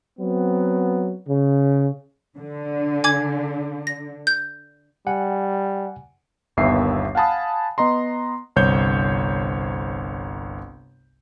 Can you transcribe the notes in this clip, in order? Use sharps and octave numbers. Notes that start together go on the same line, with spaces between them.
F#3 B3 C4
C#3
D3
G#5 D6 G#6
A#6
G6
G3 F#5 G#5
G1 D#2 A#3 B3 E5 C7
F5 F#5 G#5 A5 B5 D#6
B3 D#5 A#5 C6
G1 C2 C5 C#5 G6